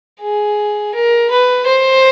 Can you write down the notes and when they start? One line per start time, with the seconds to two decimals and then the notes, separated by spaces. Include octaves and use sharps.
0.21 G#4
0.94 A#4
1.31 B4
1.67 C5